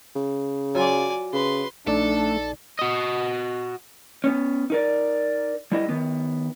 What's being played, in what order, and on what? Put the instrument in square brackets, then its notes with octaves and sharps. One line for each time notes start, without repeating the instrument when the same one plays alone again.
[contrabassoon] C#3
[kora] F#3 F4 [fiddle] D5 G#5
[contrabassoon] C#3 [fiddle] B4 C6
[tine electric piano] A#1 D#4 D5 [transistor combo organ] A3 [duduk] D4 [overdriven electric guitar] A4
[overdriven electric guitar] F#4 D#5
[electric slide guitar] B3 C#4
D#4 A#4 D5
G3 E4 D#5
D#3 B3